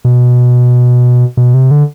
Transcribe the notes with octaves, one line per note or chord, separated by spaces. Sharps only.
B2
B2
C3
D3